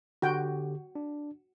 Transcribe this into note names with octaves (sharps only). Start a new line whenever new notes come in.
D3 F#4 G4 G5
D4